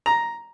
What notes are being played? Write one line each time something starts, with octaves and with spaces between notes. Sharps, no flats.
A#5